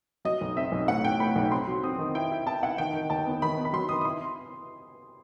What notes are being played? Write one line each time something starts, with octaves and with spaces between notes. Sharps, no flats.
F#3 D#5
B1
C4 E5
B1
A2 F#5
A2 G5
A2 B5
B1
C4 C6
F#3
C4 D#6
D#3
E4 G5
E4
E4 A5
E4 F#5
D#3 G5
D#3
D#2 A5
B3
D#3 B5
B3
B5
F#3 C6
D#3 D#6
D#6
E4 C6